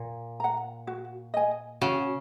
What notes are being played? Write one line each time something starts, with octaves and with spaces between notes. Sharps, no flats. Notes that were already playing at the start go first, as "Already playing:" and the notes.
Already playing: A#2
F#5 A#5
F#4
D#5 G#5
C#3 F#4